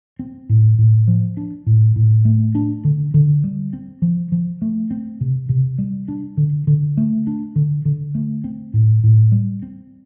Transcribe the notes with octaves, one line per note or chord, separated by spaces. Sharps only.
C4
A2
A2
F3
D4
A2
A2
A3
D4
D3
D3
G3
C4
F3
F3
A3
C4
C3
C3
G3
D4
D3
D3
A3
D4
D3
D3
A3
C4
A2
A2
G3
C4